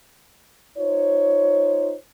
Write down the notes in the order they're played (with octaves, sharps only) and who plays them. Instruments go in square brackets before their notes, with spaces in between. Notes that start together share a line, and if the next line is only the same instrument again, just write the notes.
[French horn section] D#4 F4 C5 C#5